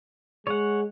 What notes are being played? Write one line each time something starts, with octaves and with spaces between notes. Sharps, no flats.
G#3 C#5 F#5